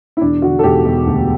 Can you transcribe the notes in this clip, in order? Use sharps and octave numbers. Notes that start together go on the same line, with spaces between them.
E4
E1 D4
D3 F#4
A4
E1 G4
E1
D2